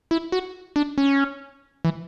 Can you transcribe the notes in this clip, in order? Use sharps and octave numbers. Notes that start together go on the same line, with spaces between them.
E4
F#4
D4
C#4
E3